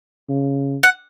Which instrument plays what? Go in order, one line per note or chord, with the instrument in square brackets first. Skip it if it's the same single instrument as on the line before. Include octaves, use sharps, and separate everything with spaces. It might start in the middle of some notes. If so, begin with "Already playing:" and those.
[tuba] C#3
[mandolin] F#5